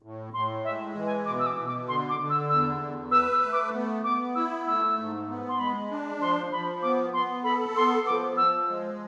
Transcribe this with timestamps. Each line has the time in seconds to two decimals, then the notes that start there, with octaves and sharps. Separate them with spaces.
0.02 A2
0.34 A2 C6
0.64 G#3 E5
0.95 E3
1.06 G#5
1.26 B2 D6
1.39 E6
1.46 D6
1.57 B2
1.67 D6
1.88 D3 C6
2.09 D6
2.19 D3
2.30 E6
2.50 E2 E6
2.81 E2
3.11 B4 E6
3.32 E6
3.43 A3
3.53 D6
3.73 B3
4.04 B3 D6
4.35 E4 E6
4.67 A3 E6
4.97 G#2
5.28 B3
5.49 C6
5.59 G#3 B5
5.91 D4
6.21 F3 C6
6.52 F3 B5
6.82 B3 D6
7.13 B3 C6
7.44 A4 B5
7.75 B3 C6
8.07 F3 D6
8.37 F3 E6
8.69 G#3